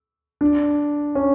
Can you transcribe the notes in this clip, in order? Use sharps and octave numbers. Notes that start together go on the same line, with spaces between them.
D4
C#4